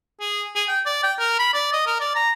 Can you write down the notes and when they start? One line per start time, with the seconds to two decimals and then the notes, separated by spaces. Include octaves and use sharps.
0.20 G#4
0.56 G#4
0.68 G5
0.85 D5
1.03 G5
1.19 A#4
1.39 B5
1.54 D5
1.73 D#5
1.87 A#4
2.00 D5
2.16 A#5